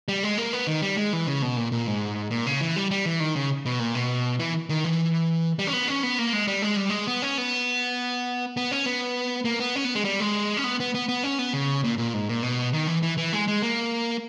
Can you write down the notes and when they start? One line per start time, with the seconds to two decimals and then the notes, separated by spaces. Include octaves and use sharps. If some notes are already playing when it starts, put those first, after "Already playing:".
0.08 G3
0.23 G#3
0.38 A#3
0.53 B3
0.67 D#3
0.82 G3
0.97 G#3
1.13 E3
1.27 C#3
1.42 B2
1.57 A#2
1.72 A#2
1.87 G#2
2.31 A#2
2.46 C#3
2.61 E3
2.76 G3
2.91 G3
3.06 E3
3.20 D#3
3.35 C#3
3.66 B2
3.79 A#2
3.95 B2
4.39 E3
4.69 D#3
4.84 E3
5.59 G3
5.67 C#4
5.73 B3
5.88 C#4
6.03 B3
6.19 A#3
6.33 G#3
6.47 G3
6.62 G#3
6.76 G3
6.90 G#3
7.07 B3
7.22 C#4
7.38 B3
8.57 B3
8.71 C#4
8.86 B3
9.45 A#3
9.60 B3
9.75 C#4
9.85 B3
9.95 G#3
10.05 G3
10.20 G#3
10.57 C#4
10.64 B3
10.80 B3
10.95 B3
11.09 B3
11.23 C#4
11.39 B3
11.53 C#3
11.84 A#2
11.98 A#2
12.14 G#2
12.29 A#2
12.43 B2
12.73 D#3
12.87 E3
13.03 E3
13.17 E3
13.33 G#3
13.48 G#3
13.62 A#3